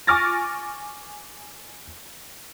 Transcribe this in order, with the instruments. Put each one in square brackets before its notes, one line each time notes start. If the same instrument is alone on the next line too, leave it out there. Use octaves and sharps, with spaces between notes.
[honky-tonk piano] G#5 C#6 D6 F6 A6 A#6